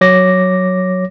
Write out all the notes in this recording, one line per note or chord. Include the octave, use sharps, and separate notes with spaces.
F#3 C#5 D6 A#6